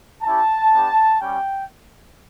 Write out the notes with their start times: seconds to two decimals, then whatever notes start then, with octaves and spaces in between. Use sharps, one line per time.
0.23 C#4 E4 G4 A5
0.72 B3 D4 G4
1.20 G3 C#4 G4 G5